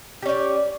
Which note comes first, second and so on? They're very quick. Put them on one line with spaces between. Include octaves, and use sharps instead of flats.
G4 C#4 D5